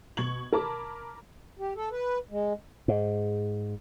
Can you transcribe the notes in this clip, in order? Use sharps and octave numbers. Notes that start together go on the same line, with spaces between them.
B2 C#6 G#6 F#7
A#4 A5 B5 D6
G4
A4
B4
G#3
G#2